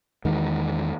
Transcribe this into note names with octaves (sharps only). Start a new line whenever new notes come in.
E2 D#3 G#3